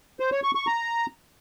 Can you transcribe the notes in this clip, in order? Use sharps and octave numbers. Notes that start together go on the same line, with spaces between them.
C5
C#5
C#6
C#6
A#5